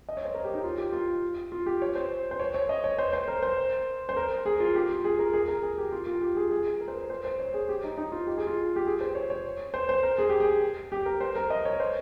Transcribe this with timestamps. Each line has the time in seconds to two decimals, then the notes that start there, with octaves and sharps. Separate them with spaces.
0.09 D#5
0.17 C#5
0.25 C5
0.34 A#4
0.44 G4
0.54 D#4
0.64 F4
0.78 G4
0.93 F4
1.52 F4
1.66 G4
1.82 C#5
1.95 C5
2.31 C5
2.39 C#5
2.54 C#5
2.69 D#5
2.84 C#5
2.98 C5
3.13 C5
3.28 A#4
3.43 C5
4.09 C5
4.16 A#4
4.46 G#4
4.60 F4
4.75 G4
4.90 F4
5.04 G#4
5.19 A#4
5.33 G#4
5.48 A#4
5.62 G#4
5.78 G4
5.92 F4
6.07 F4
6.21 G4
6.36 G#4
6.51 G#4
6.81 A#4
6.88 C5
6.96 A#4
7.10 C5
7.25 C5
7.39 C#5
7.54 G#4
7.69 G4
7.84 D#4
7.97 D#4
8.12 F4
8.27 G4
8.37 G#4
8.47 F4
8.76 G4
8.86 G#4
9.01 C5
9.15 C#5
9.30 C#5
9.74 C5
9.89 C5
10.03 A#4
10.18 G#4
10.29 G4
10.40 G#4
10.92 G4
11.06 A#4
11.21 C5
11.35 A#4
11.50 D#5
11.65 C#5
11.80 C5